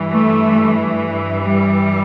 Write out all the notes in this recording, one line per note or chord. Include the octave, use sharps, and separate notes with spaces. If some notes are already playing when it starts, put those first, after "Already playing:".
Already playing: G2 E3
A3
G3